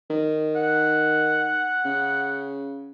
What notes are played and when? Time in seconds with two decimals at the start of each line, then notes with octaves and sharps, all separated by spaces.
0.10 D#3
0.56 F#5
1.85 C#3